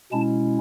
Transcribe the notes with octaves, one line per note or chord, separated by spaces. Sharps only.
B2 G#3 C#4 E4 A5